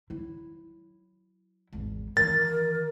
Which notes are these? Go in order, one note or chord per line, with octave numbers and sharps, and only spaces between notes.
F#3 E4
G#1 E2
D#3 E3 A#4 A6